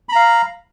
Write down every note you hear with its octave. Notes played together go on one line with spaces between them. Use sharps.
F5 A#5 B5